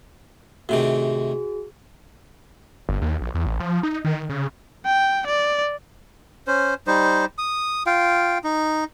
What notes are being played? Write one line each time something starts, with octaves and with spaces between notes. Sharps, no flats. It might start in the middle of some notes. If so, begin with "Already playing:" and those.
A2 C3 D#3 F#4 G#4
G1
D#2
A#1
E2
A1
F3
D#4
D#3
C#3
G5
D5
C#4 C5
G3 D#4 C5
D#6
F4 F5 G5
D#4